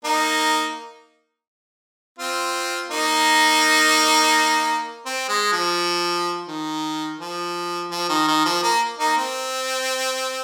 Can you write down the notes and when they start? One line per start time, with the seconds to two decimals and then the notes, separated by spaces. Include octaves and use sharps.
0.04 A#3 D#4
2.19 C4 F4
2.91 A#3 D#4
5.06 C4
5.29 G#3
5.52 F3
6.48 D#3
7.20 F3
7.91 F3
8.09 D#3
8.27 D#3
8.45 F3
8.63 A#3
8.98 A#3 D#4
9.17 C4